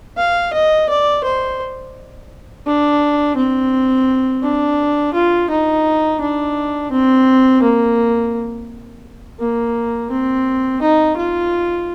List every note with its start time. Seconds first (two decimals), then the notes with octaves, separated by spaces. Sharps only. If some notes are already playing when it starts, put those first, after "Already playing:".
0.18 F5
0.53 D#5
0.89 D5
1.24 C5
2.66 D4
3.37 C4
4.43 D4
5.14 F4
5.50 D#4
6.21 D4
6.92 C4
7.62 A#3
9.40 A#3
10.11 C4
10.82 D#4
11.17 F4